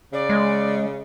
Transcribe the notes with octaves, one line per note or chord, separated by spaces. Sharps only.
C#3 D5
G#3